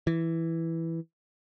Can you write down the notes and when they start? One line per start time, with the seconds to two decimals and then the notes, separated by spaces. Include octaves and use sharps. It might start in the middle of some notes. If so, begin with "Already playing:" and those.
0.07 E3